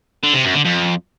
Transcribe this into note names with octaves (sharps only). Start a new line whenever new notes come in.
D3
C3
F#2
D3
F2